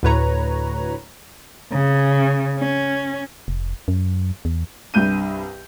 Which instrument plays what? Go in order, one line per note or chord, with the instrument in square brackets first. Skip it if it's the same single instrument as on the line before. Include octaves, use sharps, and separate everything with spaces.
[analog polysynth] D2 A2 B4 C#5 A#5
[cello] C#3
C#4
[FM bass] F1
F#2
E2
[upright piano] C2 G2 G6 D#7